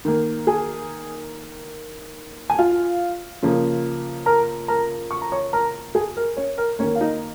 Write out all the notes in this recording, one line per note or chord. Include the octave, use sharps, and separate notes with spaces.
D#3 A#3
G#4 G#5
G#5
F4 F5
C#3 F3 A#3
A#4 A#5
A#4 A#5
C#6
A#5
C#5 C#6
A#4 A#5
G#4 G#5
A#4
C#4 C#5
A#4
D#3 A#3 C#4 C#5
F5
D#4 D#5